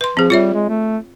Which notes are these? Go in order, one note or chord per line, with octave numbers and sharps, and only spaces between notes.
B4 C6
F3 C4 G#4
G3 F4 C#5 E5
G#3
A3